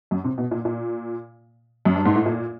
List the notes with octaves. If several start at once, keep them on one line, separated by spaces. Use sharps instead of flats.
F#2
C3
B2
A#2
A#2
F#2
G2
G#2
A2
A#2